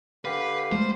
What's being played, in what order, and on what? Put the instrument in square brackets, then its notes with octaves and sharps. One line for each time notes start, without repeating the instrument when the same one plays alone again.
[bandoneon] D3 G4 F5 [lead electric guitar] B4
[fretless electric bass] G#3 A3 [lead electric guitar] C5